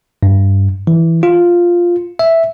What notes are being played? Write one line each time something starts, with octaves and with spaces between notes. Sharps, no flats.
G2
E3
F4
E5